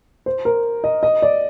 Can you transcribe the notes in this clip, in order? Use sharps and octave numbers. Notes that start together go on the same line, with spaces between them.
C5
A#4
D#5
D#5
D5